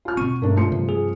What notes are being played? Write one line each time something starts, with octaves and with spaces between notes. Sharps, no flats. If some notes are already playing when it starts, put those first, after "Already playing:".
F4 F6
B2 C4 C#6 D#7
G2 A3 D4 A#4
F3 A3 C6 C#7
G2 C3
G#4